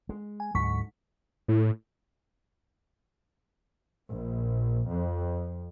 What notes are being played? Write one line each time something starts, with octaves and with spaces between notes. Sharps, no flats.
G#3
G#5
D2 G#2 D3 F#3 C#6 B6
A2
A#1
F2